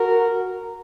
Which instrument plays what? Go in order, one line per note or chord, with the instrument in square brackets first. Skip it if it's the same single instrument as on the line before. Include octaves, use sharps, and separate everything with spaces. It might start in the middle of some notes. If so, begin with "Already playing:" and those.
Already playing: [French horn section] F#4 A#4